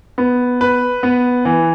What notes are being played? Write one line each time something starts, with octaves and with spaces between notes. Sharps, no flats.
B3
B4
B3
E3